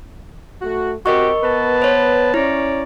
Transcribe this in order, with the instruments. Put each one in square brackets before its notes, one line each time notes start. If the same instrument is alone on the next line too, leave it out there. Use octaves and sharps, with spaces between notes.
[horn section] A3 F#4
[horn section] C4 F#4 G4 [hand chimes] A#4 D#5 C#6
[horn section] B3 B4 A5
[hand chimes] C5 C#5
[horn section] C#4 C#5 D5 [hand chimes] E4